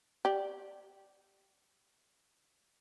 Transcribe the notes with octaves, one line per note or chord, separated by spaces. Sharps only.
G4 D5